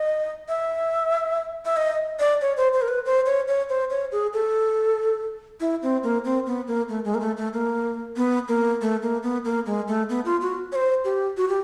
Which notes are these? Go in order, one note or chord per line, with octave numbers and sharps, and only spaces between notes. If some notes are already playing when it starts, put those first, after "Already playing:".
Already playing: D#5
E5
E5
D#5
D5
C#5
C5
C5
A#4
B4
C5
C#5
C#5
C5
C#5
G#4
A4
E4
C4
A#3
C4
B3
A#3
A3
G#3
A#3
A3
A3
A#3
B3
A#3
A3
A#3
B3
A#3
G#3
A3
B3
F4
F#4
C#5
C5
G4
F#4
G4